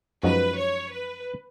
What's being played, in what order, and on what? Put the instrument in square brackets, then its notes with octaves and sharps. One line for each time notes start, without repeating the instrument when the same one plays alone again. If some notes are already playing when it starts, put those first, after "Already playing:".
[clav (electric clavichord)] F#2 F3 G#3 D#4 F#4 [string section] B4
[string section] C#5
B4